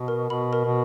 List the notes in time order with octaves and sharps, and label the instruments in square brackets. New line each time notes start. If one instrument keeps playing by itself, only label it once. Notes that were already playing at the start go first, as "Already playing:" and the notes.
Already playing: [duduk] B2
[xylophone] A#4
[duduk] B2 [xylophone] B5
[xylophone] A#4
[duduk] B2